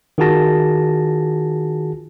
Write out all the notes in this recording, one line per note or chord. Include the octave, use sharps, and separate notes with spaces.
D#3 F4 F#4 G#4 A5 A#6